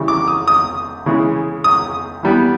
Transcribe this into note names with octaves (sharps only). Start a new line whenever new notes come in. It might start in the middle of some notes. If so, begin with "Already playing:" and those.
Already playing: C#3 E3 G3
D6
D#6
D#6
C#3 E3 G#3
D#6
E3 G3 B3